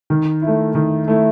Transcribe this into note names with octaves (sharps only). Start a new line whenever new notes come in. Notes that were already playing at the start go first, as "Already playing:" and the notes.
D#3
E4
A3
D#3
A3 E4